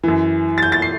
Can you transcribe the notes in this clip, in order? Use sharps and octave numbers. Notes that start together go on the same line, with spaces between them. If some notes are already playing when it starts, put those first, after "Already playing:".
F#2 E3
A6
G6
A6
C7